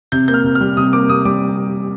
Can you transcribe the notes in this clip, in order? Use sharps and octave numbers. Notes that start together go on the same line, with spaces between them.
C3 G6
A#3 G6
F6
C3
F6
G3
C3 D#6
A#3 D6
C3 D#6
G3 D6